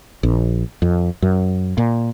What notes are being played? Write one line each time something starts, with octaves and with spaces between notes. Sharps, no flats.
A#1
F2
F#2
A#2